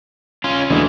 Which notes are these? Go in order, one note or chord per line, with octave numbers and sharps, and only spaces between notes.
C#4 F4
D2 E3 G#3 D4 D#6